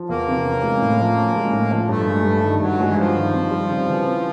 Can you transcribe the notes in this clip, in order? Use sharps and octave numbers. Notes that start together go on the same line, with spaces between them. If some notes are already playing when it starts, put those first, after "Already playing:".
Already playing: F3
E2 A#3
C3
C#4
G#3
A2
F3
C#4
G#3
A2
F3
G2 A3
G#3
G2
D#3
G2 F#3
G#3
E3
G2 F3
D#3
C4
G3
C#3
E3
C4